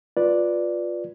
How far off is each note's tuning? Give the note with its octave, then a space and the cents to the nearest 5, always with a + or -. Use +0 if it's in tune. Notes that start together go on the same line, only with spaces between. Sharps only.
F4 +15 B4 -10 D5 +0